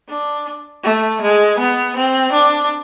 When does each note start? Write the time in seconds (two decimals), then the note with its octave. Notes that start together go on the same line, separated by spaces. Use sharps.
0.09 D4
0.84 A3
1.21 G#3
1.59 B3
1.96 C4
2.33 D4